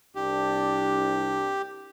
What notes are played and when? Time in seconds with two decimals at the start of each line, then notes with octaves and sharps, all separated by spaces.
0.15 C2 D4 G4